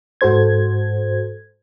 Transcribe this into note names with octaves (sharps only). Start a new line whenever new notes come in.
G#2 F#4 A4 C5 G#6